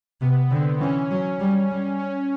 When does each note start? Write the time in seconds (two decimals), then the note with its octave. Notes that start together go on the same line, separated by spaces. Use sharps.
0.21 C3 B3
0.51 D3 C4
0.81 E3 C#4
1.10 F#3 C#4
1.40 G3
1.70 G3
1.99 C#4